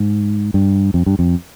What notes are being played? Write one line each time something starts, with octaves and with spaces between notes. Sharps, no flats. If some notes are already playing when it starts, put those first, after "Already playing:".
Already playing: G#2
G2
F2
G2
F2